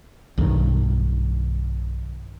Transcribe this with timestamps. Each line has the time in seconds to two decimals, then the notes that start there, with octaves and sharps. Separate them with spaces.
0.38 B1 G2 D#3